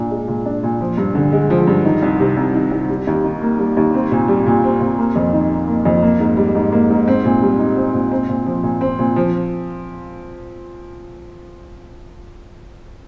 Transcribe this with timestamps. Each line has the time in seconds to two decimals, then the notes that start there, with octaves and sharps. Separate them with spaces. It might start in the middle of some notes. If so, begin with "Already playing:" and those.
Already playing: A#2 D4
0.11 G#3
0.28 A#2
0.46 D4
0.63 A#2
0.81 F3
0.98 G2
1.15 D3
1.32 G#3
1.50 F3
1.67 G2
1.85 D#3
2.02 C2
2.19 C3
2.37 C2
2.55 D#3
2.71 C2
2.90 G3
3.07 D#2
3.24 D#3
3.42 A#3
3.59 G3
3.77 D#2
3.94 C4
4.11 A#2
4.28 G3
4.46 A#2
4.64 C4
4.80 A#2
4.99 A#3
5.16 F2
5.33 D#3
5.50 D#4
5.68 A#3
5.85 F2
6.03 A#3
6.20 G#2
6.37 G3
6.55 G#2
6.72 A#3
6.90 G#2
7.08 C4
7.25 A#2
7.42 G3
7.59 D#4
7.77 C4
7.94 A#2
8.11 C4
8.29 A#2
8.46 F3
8.63 A#2
8.81 C4
8.99 A#2
9.16 F3